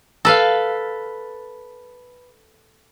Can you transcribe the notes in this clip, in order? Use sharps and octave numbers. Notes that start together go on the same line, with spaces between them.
A4 B4 F5